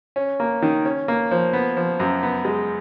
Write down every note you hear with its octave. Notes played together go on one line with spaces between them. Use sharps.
C#4
A#3
D#3
C#4
A#3
F3
B3
F3
F#2
B3
G#3